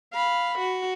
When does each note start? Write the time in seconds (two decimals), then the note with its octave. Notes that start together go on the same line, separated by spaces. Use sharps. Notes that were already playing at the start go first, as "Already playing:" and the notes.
0.14 F5 B5
0.59 F#4